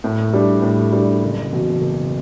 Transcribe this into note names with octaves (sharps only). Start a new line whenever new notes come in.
A2
G3 D4
A2
G3 D4
F#1
E2 B2
F#1